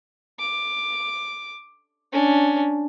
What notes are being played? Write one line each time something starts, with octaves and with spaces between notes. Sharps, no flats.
D6
C#4 D4